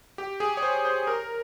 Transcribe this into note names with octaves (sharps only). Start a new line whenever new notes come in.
G4
G#4
C#5
C5
C5
A#4